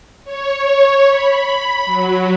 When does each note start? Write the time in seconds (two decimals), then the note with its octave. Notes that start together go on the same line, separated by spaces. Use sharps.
0.25 C#5
1.08 B5
1.85 F#3